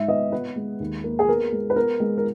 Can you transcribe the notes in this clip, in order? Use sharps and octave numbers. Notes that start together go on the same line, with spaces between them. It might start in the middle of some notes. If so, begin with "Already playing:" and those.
Already playing: G#2 E5
B3 D#5
B3 B4
G#3
D#2
A#3
G#4
B3 A#4
G#3
B4
B3 A#4
G#3
A#4